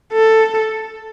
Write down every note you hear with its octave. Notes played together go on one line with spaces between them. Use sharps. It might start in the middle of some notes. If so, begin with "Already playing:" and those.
A4